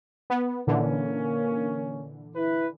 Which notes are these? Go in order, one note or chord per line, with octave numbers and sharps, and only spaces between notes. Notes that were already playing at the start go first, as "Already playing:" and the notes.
B3
A#2 D3 E3 A#3 C#4
E4 B4